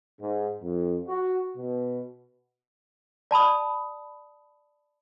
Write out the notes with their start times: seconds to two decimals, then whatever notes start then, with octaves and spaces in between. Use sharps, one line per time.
0.20 G#2
0.62 F2
1.07 F#4
1.57 B2
3.31 D5 A5 B5 D#6